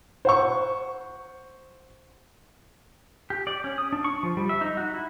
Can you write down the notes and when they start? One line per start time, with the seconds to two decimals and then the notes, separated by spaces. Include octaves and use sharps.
0.25 C5 F#5 C#6
3.30 G4
3.47 D5
3.64 C#4
3.78 D#6
3.93 D4
4.04 C#6
4.23 F3
4.37 G3
4.49 E5
4.61 D#4
4.77 F#4
4.94 E4